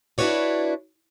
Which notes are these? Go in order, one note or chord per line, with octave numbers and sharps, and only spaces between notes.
D4 E4 F#4 B4 C#5 D5